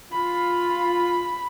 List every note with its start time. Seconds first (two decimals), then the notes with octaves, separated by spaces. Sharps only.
0.12 F4 B5